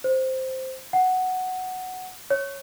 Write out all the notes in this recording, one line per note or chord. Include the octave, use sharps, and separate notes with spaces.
C5
F#5
C#5